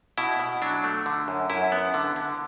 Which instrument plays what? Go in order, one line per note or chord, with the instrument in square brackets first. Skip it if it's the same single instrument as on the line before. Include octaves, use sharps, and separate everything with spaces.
[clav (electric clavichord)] B2 E4
B2
F#3 D4
A3
D3
F#2
F#2 E4
B3
D3
D3